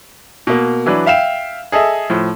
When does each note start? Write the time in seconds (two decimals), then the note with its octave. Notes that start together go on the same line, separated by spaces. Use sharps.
0.47 B2 A#3
0.86 E3 F#3 D4 B4
1.06 E5 F5 G5 E7
1.72 G#4 A4 D#5 E5
2.10 A2 F3